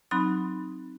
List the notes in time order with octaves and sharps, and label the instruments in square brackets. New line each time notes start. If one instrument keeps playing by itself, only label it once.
[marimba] F#3 C4 D#4 B5 F#6